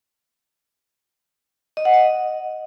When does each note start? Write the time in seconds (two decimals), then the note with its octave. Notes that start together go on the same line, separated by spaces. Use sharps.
1.77 D#5
1.85 F#5
1.94 D#5